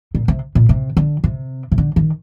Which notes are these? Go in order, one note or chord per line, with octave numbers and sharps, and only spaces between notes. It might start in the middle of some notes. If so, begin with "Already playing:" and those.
A#2
C3
A#2
C3
D3
C3
C3
D3
D#3